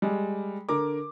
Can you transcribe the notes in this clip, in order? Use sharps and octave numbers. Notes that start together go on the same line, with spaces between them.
G3 G#3
D3 A#4 D6